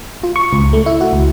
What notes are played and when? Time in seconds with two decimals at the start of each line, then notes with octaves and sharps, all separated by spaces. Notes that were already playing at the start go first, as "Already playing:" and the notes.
0.23 F4
0.36 C#6
0.53 C#2
0.73 A3
0.86 E4
1.01 F#4
1.13 C#2